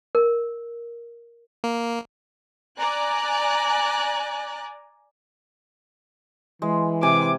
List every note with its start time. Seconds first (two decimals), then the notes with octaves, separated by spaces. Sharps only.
0.15 A#4
1.64 A#3
2.77 D5 G#5 A#5 F#6
6.62 E3 G#3
7.03 C3 G#5 D6